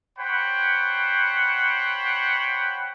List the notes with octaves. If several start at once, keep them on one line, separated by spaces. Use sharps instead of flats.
C5 C#5 F#5 G5 B5